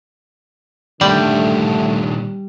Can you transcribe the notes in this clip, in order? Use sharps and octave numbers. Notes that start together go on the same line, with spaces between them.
A#2 D3 D#3 G3 A3 D4